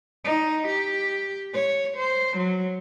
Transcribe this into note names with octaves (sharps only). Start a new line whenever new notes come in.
D#4
G4
C#5
C5
F#3